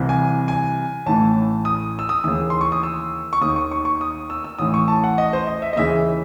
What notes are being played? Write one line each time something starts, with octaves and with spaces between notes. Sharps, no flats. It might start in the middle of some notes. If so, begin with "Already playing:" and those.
Already playing: C2 C3 E3
G#5
G#5
A1 A2 E3 A5
D#6
E6
D#6
D#2 C#3 E3 D#6
C6
C#6
D#6
E6
C#6
D#2 D#3 D#6
C#6
C#6
C#6
D#6
E6
E6
A1 A2 E3 D#6
C#6
A5
F#5
D#5
C5
D#5
E5
D#5
D#2 C#3 E3 E5